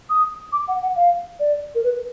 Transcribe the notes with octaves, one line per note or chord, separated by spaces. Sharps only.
D#6
D6
F#5
F#5
F5
D5
A#4
B4